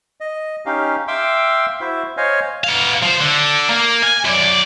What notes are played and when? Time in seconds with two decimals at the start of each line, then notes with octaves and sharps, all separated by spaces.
0.20 D#5
0.66 C#4 D#4 G4 F5
1.08 E5 F5 G5 C6 D6 E6
1.81 E4 F#4 C5 E5
2.17 C5 C#5 D#5 F5 G#5
2.64 B3 F5
3.03 F3 C5
3.21 D3
3.70 A#3
4.03 G#5
4.25 F#2 D5